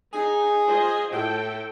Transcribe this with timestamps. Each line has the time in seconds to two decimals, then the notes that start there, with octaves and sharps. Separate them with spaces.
0.14 D#4 G#4
0.66 F4 C5 D#5
1.12 A2 A4 G5